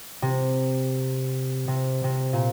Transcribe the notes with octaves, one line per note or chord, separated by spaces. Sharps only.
C3
C3
C3
A#2